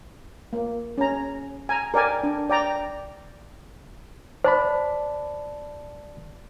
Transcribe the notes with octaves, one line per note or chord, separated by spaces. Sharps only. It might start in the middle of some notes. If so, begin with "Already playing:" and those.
A#3
C#4 A#5
G#5 A#5
A#4 D5 G5 G#5
D4
D5 G5 A#5
C5 D5 A5 B5